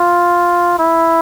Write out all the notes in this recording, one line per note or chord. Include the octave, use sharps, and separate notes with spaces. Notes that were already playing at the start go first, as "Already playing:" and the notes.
Already playing: F4
E4